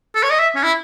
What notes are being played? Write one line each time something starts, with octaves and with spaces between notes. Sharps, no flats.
A4
C#5
D#5
E5
C#4
E4